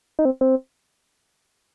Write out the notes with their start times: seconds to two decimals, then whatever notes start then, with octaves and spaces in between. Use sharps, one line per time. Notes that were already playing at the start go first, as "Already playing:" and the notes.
0.19 D#4
0.25 C4
0.41 C4